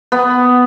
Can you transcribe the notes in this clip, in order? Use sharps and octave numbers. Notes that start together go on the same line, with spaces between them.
B3